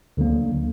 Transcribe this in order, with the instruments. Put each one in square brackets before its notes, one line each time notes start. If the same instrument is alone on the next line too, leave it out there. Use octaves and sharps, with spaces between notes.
[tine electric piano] D2 D3 F#3 A#3